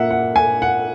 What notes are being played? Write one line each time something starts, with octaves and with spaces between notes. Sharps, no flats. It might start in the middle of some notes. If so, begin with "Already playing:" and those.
Already playing: A#2 A#3 E5 F#5
F#5
G#5
F#5